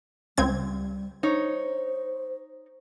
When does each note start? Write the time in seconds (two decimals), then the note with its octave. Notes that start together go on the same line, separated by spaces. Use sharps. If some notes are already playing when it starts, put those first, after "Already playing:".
0.38 C#2 G3 C4 G#6
1.23 D#4 C5 C#5